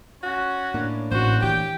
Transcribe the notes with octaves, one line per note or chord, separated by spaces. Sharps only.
C#4 F#4
A2 A#3 D4
A1 F#4 C5
E3 G4 G5